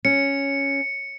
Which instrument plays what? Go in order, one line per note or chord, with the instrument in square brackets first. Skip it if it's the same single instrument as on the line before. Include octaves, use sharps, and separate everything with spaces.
[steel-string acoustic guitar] C#4 [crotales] C#7